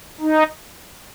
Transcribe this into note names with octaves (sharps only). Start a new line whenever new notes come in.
D#4